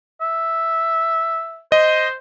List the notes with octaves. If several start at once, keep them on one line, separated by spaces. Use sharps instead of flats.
E5
C5 D#5